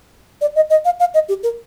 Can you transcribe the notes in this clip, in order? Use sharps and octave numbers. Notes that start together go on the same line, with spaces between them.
D5
D#5
D#5
F5
F5
D#5
G4
A#4